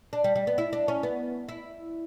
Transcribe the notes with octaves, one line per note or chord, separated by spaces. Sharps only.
D4
G3
G3
B3
E4
D4
C#4
B3
E4